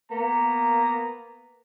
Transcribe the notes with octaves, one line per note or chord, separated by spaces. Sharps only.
A#3 B3 A#5